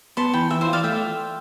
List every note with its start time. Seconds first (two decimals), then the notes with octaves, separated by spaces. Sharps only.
0.17 B3 A5 C6
0.33 E3 G5 B5
0.50 E3 E5 G5
0.61 C5 E5
0.67 F4
0.73 D5 F5
0.84 A3 E5 G5